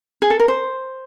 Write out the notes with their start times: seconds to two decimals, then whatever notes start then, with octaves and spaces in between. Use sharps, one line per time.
0.22 G#4
0.30 A4
0.40 A#4
0.48 C5